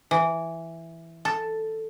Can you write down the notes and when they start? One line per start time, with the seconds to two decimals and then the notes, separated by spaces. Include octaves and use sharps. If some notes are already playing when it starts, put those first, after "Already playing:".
0.11 E3
1.25 A4